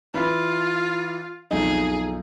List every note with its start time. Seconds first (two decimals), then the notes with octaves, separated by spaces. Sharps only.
0.14 E3 F4 B5
1.51 B1 F2 D3 D#4 G#4